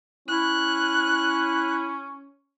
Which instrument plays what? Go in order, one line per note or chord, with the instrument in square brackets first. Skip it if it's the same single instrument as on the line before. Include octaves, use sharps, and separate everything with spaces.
[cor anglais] C#4 [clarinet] E4 [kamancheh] F#6